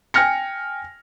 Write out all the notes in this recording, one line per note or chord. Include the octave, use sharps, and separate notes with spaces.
G5 G#5 F6 A#6 C#7